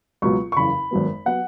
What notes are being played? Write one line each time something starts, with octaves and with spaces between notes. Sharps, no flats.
C#2 B2 F#3 B3 C#6
C#6
F#1 E2 C#3 B5
G#1 F#2 F#3 B3
F#3 B3 F#5